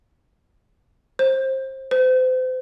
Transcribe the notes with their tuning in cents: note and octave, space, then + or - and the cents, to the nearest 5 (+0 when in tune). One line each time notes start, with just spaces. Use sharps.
C5 +25
C5 -35